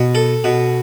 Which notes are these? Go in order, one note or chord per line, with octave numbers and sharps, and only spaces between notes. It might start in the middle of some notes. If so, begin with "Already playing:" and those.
Already playing: B2
A4
B2